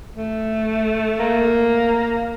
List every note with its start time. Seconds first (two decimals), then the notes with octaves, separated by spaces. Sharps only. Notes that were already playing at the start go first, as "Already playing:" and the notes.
0.15 A3
1.20 A#3